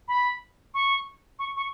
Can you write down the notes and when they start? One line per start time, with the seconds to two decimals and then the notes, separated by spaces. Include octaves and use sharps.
0.08 B5
0.74 C#6
1.39 C#6
1.56 C#6